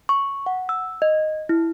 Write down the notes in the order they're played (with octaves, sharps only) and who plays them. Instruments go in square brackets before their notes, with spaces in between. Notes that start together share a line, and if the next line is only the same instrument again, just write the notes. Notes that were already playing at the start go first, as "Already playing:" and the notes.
[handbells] C#6
F#5
E6
D#5
E4